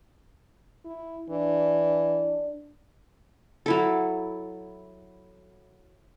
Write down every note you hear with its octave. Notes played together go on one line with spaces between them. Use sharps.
E4
E3 D4
F#3 E4 A4